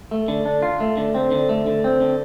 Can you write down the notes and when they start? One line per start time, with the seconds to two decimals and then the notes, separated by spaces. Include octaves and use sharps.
0.11 A3
0.28 D3
0.46 D4
0.63 F4
0.80 A3
0.97 D3
1.15 C4
1.31 D3
1.49 A3
1.67 D3
1.84 C4
2.01 D3